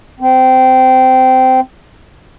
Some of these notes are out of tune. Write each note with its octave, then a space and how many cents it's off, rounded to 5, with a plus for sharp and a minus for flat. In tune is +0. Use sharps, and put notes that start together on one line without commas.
C4 -20